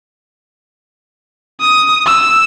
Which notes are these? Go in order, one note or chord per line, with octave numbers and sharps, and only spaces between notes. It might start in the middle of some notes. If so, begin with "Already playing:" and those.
D#6
E6